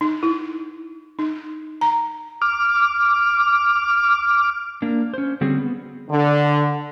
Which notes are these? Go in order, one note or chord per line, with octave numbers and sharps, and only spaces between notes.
D#4
E4
D#4
A#5
D6 F6
A#3 D4
C#4 C5
D3 G3 C4 C#4 F#4 G#4
B3
D3